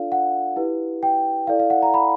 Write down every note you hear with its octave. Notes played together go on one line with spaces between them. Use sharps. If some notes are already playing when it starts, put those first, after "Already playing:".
Already playing: D4 F4 A4 D5 F5
F#5
E4 G4 B4
G5
E4 A4 D5 F5
F5
F#5
A#5
B5